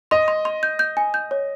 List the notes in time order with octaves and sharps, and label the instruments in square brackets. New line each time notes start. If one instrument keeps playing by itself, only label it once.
[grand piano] D#5 [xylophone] C6
[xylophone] C6
C6
G6
G6
G#5
G6
C#5